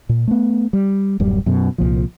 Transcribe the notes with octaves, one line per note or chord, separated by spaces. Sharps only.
A#2
A3 B3
G3
D1 F#2 G3
F#2 B2
C2 A#2 F3